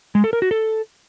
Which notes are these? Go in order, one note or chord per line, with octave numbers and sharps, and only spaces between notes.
G#3
A4
A#4
F#4
A4